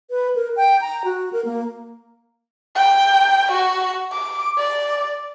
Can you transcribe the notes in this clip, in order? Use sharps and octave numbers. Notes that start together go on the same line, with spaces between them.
B4
A#4
G5
A#5
F#4
A#4
A#3
G5
F#4
D6
D5